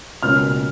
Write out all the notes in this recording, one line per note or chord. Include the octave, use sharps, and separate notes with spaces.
C#2 B2 A#3 C#4 F6